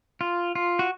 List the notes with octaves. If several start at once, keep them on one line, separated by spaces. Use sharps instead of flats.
F4
F4
F#4